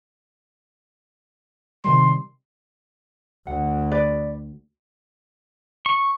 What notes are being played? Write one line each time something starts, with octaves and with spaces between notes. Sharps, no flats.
C3 D#3 G3 C6
D2 F#5
B4 D5
C#6